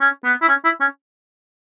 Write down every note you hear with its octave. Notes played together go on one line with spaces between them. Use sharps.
C#4
B3
E4
C#4
E4
C#4